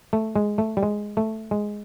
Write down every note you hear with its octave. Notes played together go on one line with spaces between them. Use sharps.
A3
G#3
A3
G3
G#3
A3
G#3